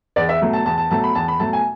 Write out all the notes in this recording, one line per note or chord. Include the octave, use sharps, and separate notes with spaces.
E2 D5
E5
B2 F#3 A3
A5
E2 A5
A5
B2 F#3 A3 A5
B5
E2 A5
B5
B2 F#3 A3 A5
G#5